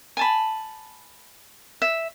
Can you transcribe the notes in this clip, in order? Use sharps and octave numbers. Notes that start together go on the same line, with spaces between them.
G#5 A5 B5
E5